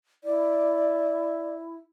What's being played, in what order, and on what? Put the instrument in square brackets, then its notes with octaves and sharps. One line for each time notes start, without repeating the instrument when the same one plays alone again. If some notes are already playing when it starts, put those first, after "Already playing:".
[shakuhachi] E4 [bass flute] D5